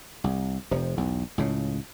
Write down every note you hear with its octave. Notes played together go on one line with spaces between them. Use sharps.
C2
F1 C3 F3
B1 E2
C#2 A2 C#3